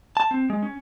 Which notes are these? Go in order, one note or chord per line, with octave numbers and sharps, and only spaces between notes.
A5
C4
G#3
C#4